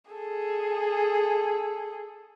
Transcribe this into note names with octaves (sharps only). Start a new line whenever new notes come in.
G#4 A4